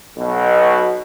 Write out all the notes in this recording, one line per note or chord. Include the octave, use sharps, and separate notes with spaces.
B1 B2